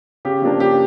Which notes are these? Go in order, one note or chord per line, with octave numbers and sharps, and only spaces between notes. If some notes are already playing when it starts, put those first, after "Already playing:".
C#3 G4
F3 A#3 D4
C#3 G4